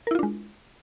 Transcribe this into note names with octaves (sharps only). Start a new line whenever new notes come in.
G#3 D4 E4 F4 A#4